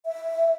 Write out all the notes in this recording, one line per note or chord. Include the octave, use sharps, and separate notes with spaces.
E5